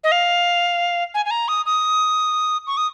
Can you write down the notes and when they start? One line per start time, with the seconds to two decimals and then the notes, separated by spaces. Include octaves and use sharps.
0.04 D#5
0.12 F5
1.14 G#5
1.25 G#5
1.31 A#5
1.48 D#6
1.65 D#6
2.67 C#6
2.77 D#6